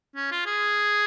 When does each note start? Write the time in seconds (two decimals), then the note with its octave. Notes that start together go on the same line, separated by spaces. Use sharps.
0.16 C#4
0.31 F4
0.46 G#4